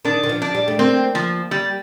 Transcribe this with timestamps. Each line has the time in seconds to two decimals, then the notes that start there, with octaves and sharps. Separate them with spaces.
0.05 D#3 D4
0.23 D#3
0.29 F3
0.42 D4
0.55 G3
0.68 A3
0.79 A#3 C4
1.15 F3
1.51 G3